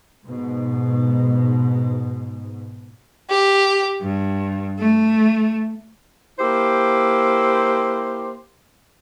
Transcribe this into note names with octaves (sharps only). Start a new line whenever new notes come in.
G#2 B2
G4
G2
A3
A#3 E4 G4 C5